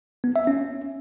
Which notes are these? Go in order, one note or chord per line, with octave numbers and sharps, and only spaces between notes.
B3
E5
C#4